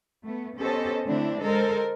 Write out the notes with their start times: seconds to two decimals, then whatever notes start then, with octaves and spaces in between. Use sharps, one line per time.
0.25 A3 B3
0.58 B3 C#4 G4 A4 C5 D#5
1.06 D3 A3 C4 D4 E4
1.41 G#3 A4 A#4 C5 D#5